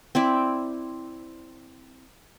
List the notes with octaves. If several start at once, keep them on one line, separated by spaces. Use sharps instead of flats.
C4 E4 D5